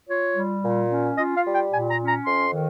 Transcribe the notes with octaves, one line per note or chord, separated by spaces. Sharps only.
F4 C#5
G3
A#2
C#4
F4 D#5
F5
G3
G5
A#2 G#5
A#5
C#4
A#5
F2 C6
D#3